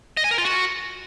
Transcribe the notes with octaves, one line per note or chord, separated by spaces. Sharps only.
D#5
G#5
A#4
F4
F#4